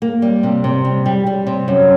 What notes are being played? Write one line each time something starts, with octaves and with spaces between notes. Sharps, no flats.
A#3
G3
C3
C3
G3
G3
G3
C3
F#2